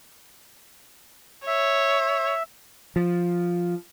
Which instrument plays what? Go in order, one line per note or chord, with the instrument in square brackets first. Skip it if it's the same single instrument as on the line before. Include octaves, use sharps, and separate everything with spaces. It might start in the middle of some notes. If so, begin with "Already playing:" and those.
[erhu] C#5 [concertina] E5
[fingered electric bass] F3